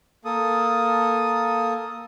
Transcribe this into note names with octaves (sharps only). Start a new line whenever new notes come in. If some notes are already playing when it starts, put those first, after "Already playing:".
A#3 A4 D#6